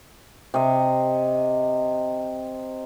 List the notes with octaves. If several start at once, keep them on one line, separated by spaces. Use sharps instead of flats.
C3 D#5